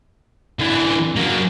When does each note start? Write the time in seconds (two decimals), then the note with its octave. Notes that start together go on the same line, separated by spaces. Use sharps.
0.59 D3 E3
1.16 F#3 A#3